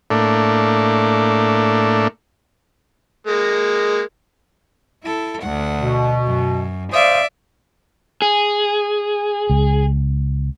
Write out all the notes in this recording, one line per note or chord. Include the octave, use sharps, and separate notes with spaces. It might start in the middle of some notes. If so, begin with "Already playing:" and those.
A2 A3 A#3 D4
G#3 A#3
E4 A4
D2 F#5
B2
F#2
C5 D5 E5 F5 D#6
G#4
C#2